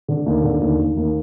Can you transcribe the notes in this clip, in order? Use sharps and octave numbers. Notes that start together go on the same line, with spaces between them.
D3
D#2
D3
D#2
D#2
D#2